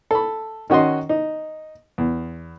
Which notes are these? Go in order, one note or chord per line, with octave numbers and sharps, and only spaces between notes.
A4 B5
D#3 C#4 F#4 D#5 C6
D#4
E2